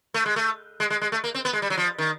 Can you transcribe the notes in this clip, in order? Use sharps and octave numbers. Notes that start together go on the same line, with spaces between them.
A3
G#3
A3
G#3
G#3
G#3
A3
A#3
C4
B3
G#3
G3
F#3
F3
D#3